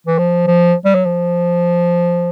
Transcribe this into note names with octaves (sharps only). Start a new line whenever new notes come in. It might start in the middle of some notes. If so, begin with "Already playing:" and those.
E3
F3
F3
G3
F#3
F3